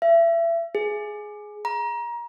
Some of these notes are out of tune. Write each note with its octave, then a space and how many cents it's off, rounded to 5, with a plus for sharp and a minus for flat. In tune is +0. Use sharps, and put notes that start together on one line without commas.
E5 +30
G#4 +10
A#5 +30